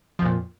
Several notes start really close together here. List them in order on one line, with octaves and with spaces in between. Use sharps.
F3 F2 A#2